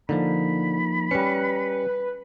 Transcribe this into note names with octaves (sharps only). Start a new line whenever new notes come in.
D3 F3 A#3 D#4 B5
G3 C#4 B4 C#7